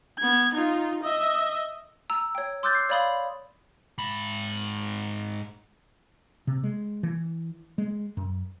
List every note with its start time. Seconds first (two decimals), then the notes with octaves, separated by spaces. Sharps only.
0.18 B3 G#6
0.54 D#4 F4
1.03 D#5 E5
2.10 A#5 E6
2.35 C#5 G5
2.63 C6 D6 E6 F#6 G6 A6
2.75 C7
2.89 C#5 D5 F5 B5 C6 D#6
3.98 G#2 B5
6.47 C3
6.64 G#3
7.03 E3
7.78 G#3
8.17 F#2